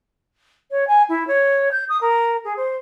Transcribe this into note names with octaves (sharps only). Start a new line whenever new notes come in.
C#5
G#5
E4
C#5
G6
D#6
A#4
G#4
C5